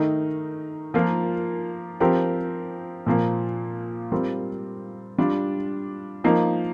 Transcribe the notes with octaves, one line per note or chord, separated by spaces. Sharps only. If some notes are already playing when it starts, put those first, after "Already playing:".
Already playing: D#3 A3 D#4 A#4
F3 A#3 F4 A#4
F3 C4 G4 A#4
A#2 F3 A#3
G3 C4 F4 A#4
G3 D4 F4
F3 A#3 D#4